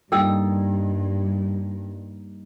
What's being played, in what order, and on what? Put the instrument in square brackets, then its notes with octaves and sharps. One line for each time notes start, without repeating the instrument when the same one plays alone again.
[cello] G2 [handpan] G3 A#3 D#4 [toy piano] A4 G5 E6